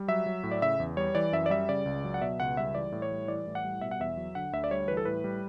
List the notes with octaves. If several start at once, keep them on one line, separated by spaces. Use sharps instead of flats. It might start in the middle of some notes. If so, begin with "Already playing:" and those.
Already playing: G3
F#3 E5
F#3
A2
D5
C#3 E5
E2
G3 C#5
E3 D5
F#2 E5
D5
G3 E5
C#3 D5
C#2
F#3
F#5
B2 E5
C#2 F#5
G3 E5
E3 D5
A2
C#5
G3
E3 D5
A2
F#5
G3
B2 E5
F#5
E2 E5
F#3
D3 F#5
D2 E5
D5
G3 C#5
E3 B4
A4
A2 B4
G3